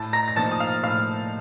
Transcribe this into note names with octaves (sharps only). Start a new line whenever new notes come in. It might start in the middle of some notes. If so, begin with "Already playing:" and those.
Already playing: A2 A5 A6
A#5 A#6
A#6
F3 A#3 D#4 A5 A6
D#6
F5 F6
A2 F5 F6